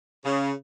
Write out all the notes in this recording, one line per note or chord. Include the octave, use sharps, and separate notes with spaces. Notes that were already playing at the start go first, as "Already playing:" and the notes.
C#3